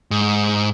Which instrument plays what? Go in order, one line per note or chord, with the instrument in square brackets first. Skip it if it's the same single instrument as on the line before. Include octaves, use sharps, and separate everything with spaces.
[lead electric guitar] G#2